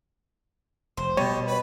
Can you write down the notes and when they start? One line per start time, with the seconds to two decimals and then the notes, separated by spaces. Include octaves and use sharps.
0.97 F1 C5
1.17 B2 G3 G4 C#5
1.47 B4 B5